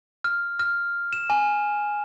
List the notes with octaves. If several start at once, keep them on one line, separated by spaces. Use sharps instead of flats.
F6
F6
E7
G#5